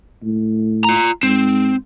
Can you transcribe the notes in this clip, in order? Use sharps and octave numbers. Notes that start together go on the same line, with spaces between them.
A2
F4 A#5
G#2 C4